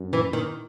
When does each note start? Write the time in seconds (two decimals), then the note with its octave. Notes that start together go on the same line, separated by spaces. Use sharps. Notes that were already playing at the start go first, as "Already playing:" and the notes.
Already playing: F#2
0.13 E3
0.33 D#3